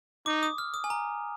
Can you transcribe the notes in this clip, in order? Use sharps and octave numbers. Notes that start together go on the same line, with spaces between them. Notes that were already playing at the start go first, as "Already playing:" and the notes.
D#4 D6
D#6
F6
D#6
G#5
A#5